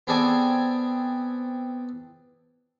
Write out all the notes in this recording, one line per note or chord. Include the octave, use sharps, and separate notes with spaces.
B3 C4 G#4 A4 D5 G#5